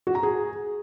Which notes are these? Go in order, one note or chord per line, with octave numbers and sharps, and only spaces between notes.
F#4
A#5
G#4